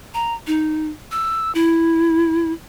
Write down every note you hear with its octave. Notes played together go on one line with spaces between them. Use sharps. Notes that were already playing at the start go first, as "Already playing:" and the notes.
A#5
D#4
E6
E4